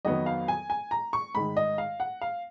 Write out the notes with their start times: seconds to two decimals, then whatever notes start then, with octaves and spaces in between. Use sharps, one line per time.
0.05 F2 D#3 F#3 B3 D#5
0.26 F5
0.48 G#5
0.70 G#5
0.91 A#5
1.13 C#6
1.35 G#2 D#3 G#3 B5
1.57 D#5
1.78 F5
2.00 F#5
2.21 F5